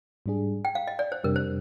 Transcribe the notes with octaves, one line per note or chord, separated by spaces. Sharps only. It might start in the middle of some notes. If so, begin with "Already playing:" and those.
G#2 G3 D4 G#4
G5
F5
D#5
D5
C5
F2 C3 G3 D4 G4 A#4
C5